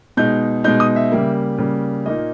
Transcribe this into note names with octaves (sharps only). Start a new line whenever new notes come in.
B2 G#3 D#4 G6
B2 G#3 D#4 G6
D#6
E5
C#3 G3 A#3
C#3 G3 A#3
A#2 A#3 D#4 D#5